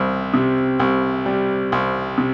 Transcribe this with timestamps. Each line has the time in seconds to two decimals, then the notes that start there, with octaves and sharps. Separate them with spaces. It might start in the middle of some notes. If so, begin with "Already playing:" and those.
Already playing: C2 G3
0.34 C3
0.80 C2
1.26 G3
1.72 C2
2.18 C3